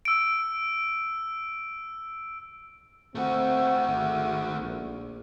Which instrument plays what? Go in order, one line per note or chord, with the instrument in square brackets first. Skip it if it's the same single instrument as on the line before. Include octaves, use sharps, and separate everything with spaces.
[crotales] E6 D7
[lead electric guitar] A3 F#4 [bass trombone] C4
[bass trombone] G#1
A#1